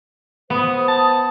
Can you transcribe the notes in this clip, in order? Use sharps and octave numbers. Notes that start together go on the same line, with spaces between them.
B3 C5 D#6
A5